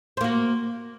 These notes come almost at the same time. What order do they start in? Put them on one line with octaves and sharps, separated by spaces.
C5 A#3 F#4